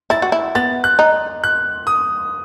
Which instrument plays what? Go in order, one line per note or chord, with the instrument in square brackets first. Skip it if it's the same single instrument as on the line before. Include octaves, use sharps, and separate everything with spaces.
[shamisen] E4 [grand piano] A6
[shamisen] F#4
E4
[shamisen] B3 [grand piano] A6
[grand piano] F#6
[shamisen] D#4
[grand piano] F#6
D#6